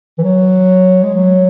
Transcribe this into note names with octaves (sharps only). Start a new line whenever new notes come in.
E3
F#3
G#3
F#3